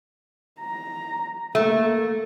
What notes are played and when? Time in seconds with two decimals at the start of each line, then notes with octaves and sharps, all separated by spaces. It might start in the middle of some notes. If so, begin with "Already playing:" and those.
0.60 A#5
1.55 A3 A#3